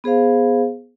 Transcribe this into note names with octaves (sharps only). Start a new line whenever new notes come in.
B3 G#4 C5 F5